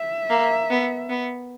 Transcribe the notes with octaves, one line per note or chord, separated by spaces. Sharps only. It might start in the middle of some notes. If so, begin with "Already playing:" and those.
Already playing: E5
A#3
B3
B3